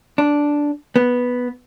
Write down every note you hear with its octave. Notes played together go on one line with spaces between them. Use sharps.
D4
B3